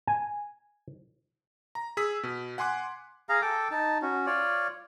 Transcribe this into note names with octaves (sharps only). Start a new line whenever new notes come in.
G#5
A#5
G#4 E6 B6
B2
F#5 G#5 C6 D6 F#6
G#4 F5 A#5
A4 G5 D6
D#4 A5
C#4 F#4
F4 C#5 D5